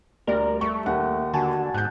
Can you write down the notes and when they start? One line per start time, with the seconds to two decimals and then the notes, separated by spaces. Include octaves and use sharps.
0.27 D2 G3 A#4 D5
0.61 A3 C#6
0.86 D#2 F#5
1.33 D3 F#4 G#5 A5
1.74 G#2 F#6 G6